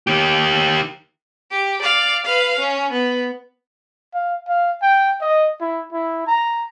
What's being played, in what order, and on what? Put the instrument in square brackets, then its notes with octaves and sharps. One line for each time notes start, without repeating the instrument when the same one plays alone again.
[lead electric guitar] D#3 G4
[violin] G4
D5 F5
B4 F5
C#4
B3
[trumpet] F5
F5
G5
D#5
E4
E4
A#5